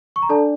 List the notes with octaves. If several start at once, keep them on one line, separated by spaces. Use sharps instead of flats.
C#6
A#5
D4 A4 D5 A5